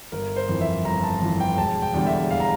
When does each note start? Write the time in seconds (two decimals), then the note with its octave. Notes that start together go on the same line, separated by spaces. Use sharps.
0.12 G1 A#4
0.36 C5
0.49 F2 E3
0.61 E5
0.85 G1 A#5
1.03 A5
1.22 F2 E3
1.40 G5
1.57 E1 A5
1.82 G5
1.94 E2 D3 G3
2.07 E5
2.30 E1 F5
2.40 A#5